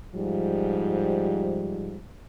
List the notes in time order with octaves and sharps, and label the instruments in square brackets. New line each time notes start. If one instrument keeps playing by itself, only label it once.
[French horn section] G#2 F3 G3